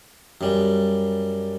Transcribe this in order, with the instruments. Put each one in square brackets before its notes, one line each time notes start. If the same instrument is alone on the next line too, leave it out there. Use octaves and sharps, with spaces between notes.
[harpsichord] F#2 G3